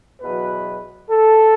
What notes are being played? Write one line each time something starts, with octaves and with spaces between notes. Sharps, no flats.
E2 B2 F#3 B4
A4